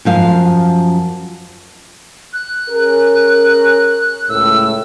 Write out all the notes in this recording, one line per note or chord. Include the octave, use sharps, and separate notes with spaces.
F#2 F3 F5
F#6
C#4 G#4 A#4
C#2 A2 E6